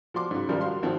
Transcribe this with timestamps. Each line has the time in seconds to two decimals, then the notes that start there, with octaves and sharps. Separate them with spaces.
0.14 F3 F#4 C6 D6
0.31 G#2 C#3 F#3
0.49 G#1 C#3 F3 G3 A#4
0.61 F#4 F5 C6
0.82 G#1 D#3 F3 C4 F#4